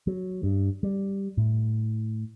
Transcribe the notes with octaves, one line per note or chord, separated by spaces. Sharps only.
F#3
G2
G3
A2